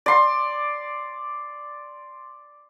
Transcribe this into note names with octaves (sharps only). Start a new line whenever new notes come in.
D5 C6